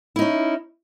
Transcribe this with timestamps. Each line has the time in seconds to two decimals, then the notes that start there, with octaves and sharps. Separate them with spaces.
0.16 E4
0.19 D#4
0.22 C#4